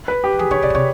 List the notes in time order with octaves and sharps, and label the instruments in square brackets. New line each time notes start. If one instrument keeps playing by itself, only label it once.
[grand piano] B4
G4
[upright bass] D#3
[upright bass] E3 [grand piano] G#4
[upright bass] D3 [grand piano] C#5
[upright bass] C#3 [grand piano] D5
[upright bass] B2
[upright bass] C3 [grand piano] C#5